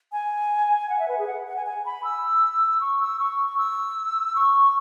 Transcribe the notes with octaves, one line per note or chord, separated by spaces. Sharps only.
G#5
F#5
E5
B4
G#4
F#5
F#5
G#5
G#5
B5
E6
C#6
E6
C#6
E6
C#6